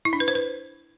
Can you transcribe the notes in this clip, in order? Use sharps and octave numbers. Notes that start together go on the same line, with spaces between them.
E4
D4
B4
C5
B4